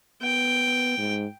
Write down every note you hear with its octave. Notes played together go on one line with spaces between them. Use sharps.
B3 G5
G#2